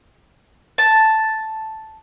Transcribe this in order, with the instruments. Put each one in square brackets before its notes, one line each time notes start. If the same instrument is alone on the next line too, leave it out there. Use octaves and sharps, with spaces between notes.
[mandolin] A5